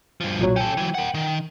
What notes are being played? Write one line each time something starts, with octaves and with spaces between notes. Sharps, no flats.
G2 F3
B1 A#2 F#3
C#4 A4 G5
E3 F#3
A#4 F#5
D#3